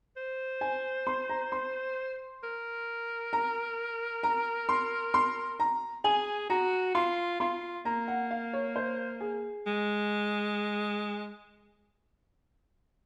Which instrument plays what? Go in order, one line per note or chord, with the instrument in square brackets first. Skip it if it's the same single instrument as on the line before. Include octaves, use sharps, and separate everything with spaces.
[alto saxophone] C5
[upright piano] G#5
C6
A#5
C6
[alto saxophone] A#4
[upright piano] A#5
A#5
C6
C6
A#5
[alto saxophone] G#4 [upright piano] G#5
[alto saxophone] F#4 [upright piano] A#5
[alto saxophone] F4 [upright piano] C6
[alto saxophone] F4 [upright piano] C6
[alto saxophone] A#3 [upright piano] A#5
[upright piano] F#5
F5
C#5
C5
G#4
[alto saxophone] G#3